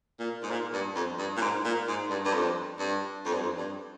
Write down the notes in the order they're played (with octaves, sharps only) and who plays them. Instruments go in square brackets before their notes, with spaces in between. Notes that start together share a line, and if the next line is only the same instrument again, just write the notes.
[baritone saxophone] A#2
G#2
A#2
G2
F2
G2
A#2
G#2
A#2
G#2
G2
G2
F2
G2
F2
G2
F2
G2